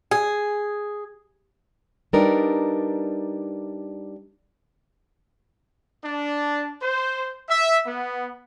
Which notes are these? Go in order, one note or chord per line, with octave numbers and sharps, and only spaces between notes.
G#4
G3 D4 D#4 A#4 B4 D5
D4
C5
E5
B3